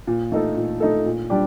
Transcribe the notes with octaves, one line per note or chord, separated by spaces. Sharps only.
A#2
A3 D#4 A4
A#2
A3 D#4 A4
A#2
G3 D4 G4 D5